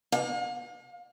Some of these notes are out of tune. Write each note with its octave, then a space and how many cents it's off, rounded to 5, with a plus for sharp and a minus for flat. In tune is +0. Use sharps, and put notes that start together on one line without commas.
F5 +40